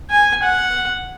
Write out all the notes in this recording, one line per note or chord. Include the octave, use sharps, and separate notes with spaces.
G#5
F#5